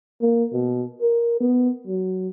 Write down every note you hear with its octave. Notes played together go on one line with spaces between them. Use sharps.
A#3
B2
A#4
B3
F#3